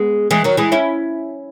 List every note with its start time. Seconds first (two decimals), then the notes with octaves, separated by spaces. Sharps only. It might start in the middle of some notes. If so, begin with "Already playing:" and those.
Already playing: G#3 B3
0.31 E3 G#3
0.44 D#3 F#3
0.57 E3 G#3
0.72 C#4 E4